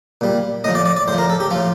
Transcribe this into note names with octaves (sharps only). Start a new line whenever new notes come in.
A#2 G3
A2 F3 D#5
D5
D5
D5
A2 F3 C5
A#4
A4
G4
A2 F3 F4